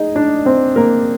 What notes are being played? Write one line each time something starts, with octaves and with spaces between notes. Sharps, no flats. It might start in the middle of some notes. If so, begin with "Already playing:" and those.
Already playing: D#4 G#4 D#5
D4 D5
C4 C5
A#3 A#4